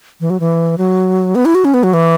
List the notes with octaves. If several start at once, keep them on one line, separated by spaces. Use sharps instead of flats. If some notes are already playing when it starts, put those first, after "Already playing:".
E3
F#3
E3
F#3
B3
E4
F#4
C#4
B3
F#3
E3